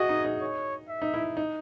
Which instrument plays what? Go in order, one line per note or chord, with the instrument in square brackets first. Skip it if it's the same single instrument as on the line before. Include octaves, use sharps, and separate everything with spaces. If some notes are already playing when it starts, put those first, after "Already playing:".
Already playing: [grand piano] E4 F#4 G#4 [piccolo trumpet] D#5
[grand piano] D#4
D#4
[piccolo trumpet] C#5
E5
[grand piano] D#4
E4
D#4